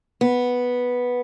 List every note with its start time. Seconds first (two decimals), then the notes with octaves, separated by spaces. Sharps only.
0.21 B3